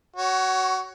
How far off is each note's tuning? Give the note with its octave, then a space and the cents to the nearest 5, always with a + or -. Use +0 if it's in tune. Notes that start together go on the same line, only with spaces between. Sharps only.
F#4 +20 C#5 +0